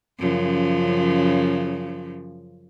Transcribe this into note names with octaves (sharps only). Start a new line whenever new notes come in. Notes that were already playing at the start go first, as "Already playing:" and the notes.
F#2 C#3 F3